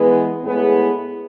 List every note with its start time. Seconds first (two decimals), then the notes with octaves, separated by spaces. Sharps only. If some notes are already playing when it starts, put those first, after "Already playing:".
Already playing: E3 G#3 B3
0.42 A2 G#3 B3 E4 G#4